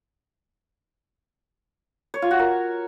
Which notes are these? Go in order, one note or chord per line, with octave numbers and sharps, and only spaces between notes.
C#5
F4
F#4
A#4